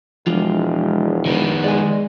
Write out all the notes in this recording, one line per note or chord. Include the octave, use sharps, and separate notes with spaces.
E1 F3 G#3 D4 F4
D#3 B3
G#3 D5 G#5